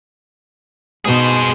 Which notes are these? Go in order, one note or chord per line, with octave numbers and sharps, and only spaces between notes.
B2 G#4 C5